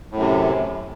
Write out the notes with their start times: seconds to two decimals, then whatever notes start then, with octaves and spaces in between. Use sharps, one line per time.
0.12 A2
0.16 F#2
0.19 C3